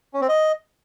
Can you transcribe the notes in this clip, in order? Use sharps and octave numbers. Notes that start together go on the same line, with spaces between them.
C#4
C4
D#5